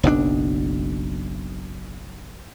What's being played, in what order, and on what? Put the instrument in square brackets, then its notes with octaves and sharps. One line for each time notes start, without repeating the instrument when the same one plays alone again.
[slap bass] F#1 B1 A2 D4